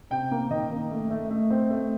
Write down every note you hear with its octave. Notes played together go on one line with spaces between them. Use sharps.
C3 G5
A#3
D#3 D#5
A#3
A3
A3
A3
C4
A3